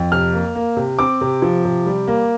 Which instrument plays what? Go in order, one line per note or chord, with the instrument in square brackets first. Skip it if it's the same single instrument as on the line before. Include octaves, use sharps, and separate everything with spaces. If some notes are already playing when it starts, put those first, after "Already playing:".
Already playing: [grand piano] F2
C3 F6
A#3
A#3
C3
C4 D6
C3
F3
C3
G3
A#3